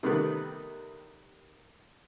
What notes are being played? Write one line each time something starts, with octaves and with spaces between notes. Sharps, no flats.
C3 D#3 G3 A3 B3 B4